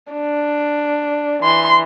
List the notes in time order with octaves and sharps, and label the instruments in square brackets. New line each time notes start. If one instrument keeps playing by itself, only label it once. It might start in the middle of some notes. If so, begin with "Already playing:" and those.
[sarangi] D4
[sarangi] E3 [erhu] C6